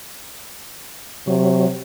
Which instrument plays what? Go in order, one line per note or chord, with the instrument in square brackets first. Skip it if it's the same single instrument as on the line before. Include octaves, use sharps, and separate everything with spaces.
[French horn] C3 [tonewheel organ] F#3